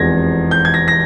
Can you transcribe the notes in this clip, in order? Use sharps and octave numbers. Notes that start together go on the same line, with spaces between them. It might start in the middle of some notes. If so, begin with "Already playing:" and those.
Already playing: F1 E2 C3 F3 G#3 G#6 A#6
G6
G#6
A#6
A#6